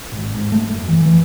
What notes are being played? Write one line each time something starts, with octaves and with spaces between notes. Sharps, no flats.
G#1
G#2
A3
F#2
E3
E3